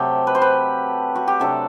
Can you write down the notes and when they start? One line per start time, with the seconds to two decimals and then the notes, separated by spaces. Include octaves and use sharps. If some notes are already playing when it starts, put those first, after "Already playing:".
Already playing: C3 F#3 A3 G4 A4
0.27 B4
0.35 C5
0.42 B4
1.15 F#4
1.28 G4
1.40 C3 F#3 A3 D4 A4